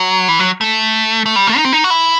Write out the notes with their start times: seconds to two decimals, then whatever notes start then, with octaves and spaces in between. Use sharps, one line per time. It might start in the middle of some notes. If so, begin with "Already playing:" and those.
Already playing: F#3
0.28 E3
0.39 F#3
0.61 A3
1.26 A3
1.36 G3
1.47 A3
1.57 D#4
1.65 C4
1.73 D#4
1.84 F#4
1.90 E4